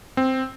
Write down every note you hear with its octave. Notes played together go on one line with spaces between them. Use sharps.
C4